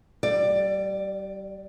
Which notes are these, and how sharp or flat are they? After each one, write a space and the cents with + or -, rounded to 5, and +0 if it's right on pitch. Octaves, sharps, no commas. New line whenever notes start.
G3 -30 D5 +15